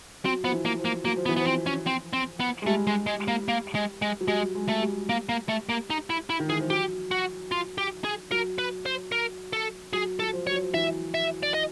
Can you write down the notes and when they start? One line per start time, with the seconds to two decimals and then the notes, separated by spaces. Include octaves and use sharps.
0.25 F#3 C4
0.44 F3 B3
0.52 E3
0.65 A#3
0.79 F3
0.85 A#3
1.05 F#3 A#3
1.16 F3
1.26 B3
1.29 E3
1.36 F3 B3
1.47 C4
1.66 C#4
1.87 C4
2.13 C4
2.40 B3
2.62 G#3
2.67 G3 A3
2.87 G#3
3.07 G#3
3.28 A#3
3.48 A#3
3.75 G#3
4.02 G#3
4.21 F#3
4.28 G3 G#3
4.55 G#3
4.69 A3
4.82 G3
5.09 A#3
5.29 A#3
5.49 A3
5.69 A#3
5.90 D#4
6.10 E4
6.30 E4
6.40 D#3
6.49 E3 G#4
6.60 F3
6.70 F#3 G4
7.11 F#4
7.52 F4
7.78 G4
8.04 G#4
8.31 F#3 A#4
8.58 B4
8.86 C5
9.12 A#4
9.53 A4
9.93 F#3 G#4
10.19 F#3 A4
10.33 F3
10.47 C#5
10.51 F#3
10.62 F3
10.74 E3 E5
11.14 E5
11.43 D5
11.54 D#5